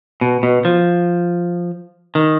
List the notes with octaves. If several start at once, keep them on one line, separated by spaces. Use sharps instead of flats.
B2
B2
F3
D#3